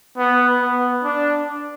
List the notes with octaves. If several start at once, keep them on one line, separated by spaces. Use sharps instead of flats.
B3
B3
D4